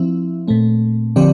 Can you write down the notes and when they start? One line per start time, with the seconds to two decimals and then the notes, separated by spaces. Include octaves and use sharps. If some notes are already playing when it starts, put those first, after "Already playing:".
Already playing: F3 C4 E4
0.48 A#2 A3 C4
1.16 D3 F3 C4 G4 D5